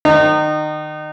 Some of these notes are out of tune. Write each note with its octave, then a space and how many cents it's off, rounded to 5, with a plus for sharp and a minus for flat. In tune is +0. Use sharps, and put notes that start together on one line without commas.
D#3 -25 D#4 -30